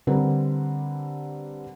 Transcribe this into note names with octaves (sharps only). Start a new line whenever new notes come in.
D3 G3 C4 A#4 B4